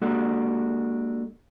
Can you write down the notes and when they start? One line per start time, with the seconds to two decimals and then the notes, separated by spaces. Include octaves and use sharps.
0.02 G#3 A#3 D4 F#4 G4 A4